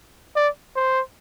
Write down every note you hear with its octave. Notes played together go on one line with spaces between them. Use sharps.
D5
C5